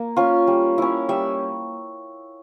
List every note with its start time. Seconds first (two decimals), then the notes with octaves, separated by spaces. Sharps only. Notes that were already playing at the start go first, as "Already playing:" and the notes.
Already playing: A#3
0.16 C#4 F4
0.47 G3
0.78 C#4 E4
1.09 G3 E5